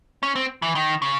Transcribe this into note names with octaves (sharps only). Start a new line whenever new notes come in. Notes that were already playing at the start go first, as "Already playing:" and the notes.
C#4
C4
E3
D#3
C#3